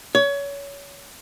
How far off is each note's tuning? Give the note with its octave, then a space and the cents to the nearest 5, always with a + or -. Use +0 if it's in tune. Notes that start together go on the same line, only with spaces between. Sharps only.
C#5 +25